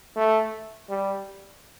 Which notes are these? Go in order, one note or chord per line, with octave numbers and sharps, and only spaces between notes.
A3
G3